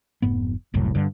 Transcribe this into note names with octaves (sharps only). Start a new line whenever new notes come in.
F1 G#2 B3
F#1 C2 F#2 A2
G2 D3